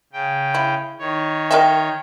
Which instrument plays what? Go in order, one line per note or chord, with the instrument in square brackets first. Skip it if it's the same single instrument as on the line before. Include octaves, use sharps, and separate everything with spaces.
[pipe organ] C#3 G5
[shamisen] E4
[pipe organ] D#3 C#5
[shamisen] A#4 D#5 E5 [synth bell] G5